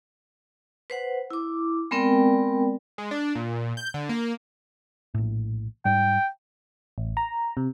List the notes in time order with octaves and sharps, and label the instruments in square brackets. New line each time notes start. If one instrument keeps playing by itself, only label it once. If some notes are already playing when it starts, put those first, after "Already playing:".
[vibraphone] B4 C5 F#5
E4 D6
G#3 B3 C4 A#4 D5 G5
[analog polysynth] G#3
D4
A#2
G6
D3
A#3
[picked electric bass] A#1 A2
[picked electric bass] G#2 G3 [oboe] G5
[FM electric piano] A1
A#5
C3